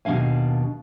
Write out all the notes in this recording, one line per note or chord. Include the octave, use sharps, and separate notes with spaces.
D#2 B2 G#3 D4 F5 G#5